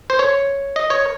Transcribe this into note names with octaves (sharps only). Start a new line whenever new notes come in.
C5
C#5
D#5
C#5